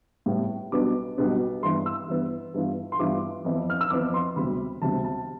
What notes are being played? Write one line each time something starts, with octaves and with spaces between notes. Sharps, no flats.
A2 G3 B3
B1 B2 G3 B3 D4 D6
B1 B2 G3 B3 D4
G2 E3 B3 C6
E6
G2 E3 B3
G2 E3 B3 F4
C6
G2 E3 B3 F4 D6
F2 E3 B3
F6
E6
F2 E3 B3 D6
C6
E1 D2 C3 G3 B5
E1 D2 C3 G3 A5
A5